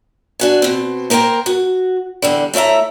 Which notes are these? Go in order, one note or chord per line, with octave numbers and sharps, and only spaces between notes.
D4 F#4 G#5
B2 C4
A#3 A#4 C5 G5 A#5
F#4
E2 D3 G3
A3 E4 C#5 E5 A#5